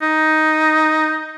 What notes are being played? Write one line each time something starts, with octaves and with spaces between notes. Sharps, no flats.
D#4